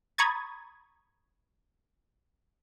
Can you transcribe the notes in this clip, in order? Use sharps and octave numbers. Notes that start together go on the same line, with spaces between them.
A#5 B5 C#6 D#6 G#6 A6